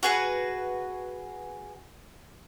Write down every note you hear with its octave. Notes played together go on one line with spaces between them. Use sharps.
F#4 G#4 B4